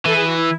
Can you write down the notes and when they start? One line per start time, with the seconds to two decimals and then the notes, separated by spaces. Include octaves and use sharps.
0.06 E3 A4
0.16 G#4
0.26 F#4
0.36 E4